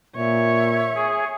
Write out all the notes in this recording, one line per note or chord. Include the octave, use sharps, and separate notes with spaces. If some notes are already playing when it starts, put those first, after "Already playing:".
A#2 C#5 E5
G#4